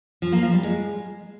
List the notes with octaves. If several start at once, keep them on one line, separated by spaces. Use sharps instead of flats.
F3
A#3
F3
G3
G#3